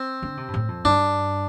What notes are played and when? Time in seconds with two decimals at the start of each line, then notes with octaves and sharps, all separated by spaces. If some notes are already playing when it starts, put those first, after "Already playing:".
Already playing: C4
0.22 D3
0.37 C3
0.48 G2
0.54 A2
0.68 F2
0.84 G2 D4